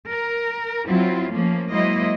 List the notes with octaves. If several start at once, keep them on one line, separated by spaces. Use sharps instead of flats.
A#4
F#3 C4 E4 F4
F3 A3 A#3 C#4
F#3 G#3 A#3 E4 C5 D#5